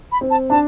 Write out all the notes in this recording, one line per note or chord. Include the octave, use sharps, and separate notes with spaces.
B5
C4
A5
D4 A5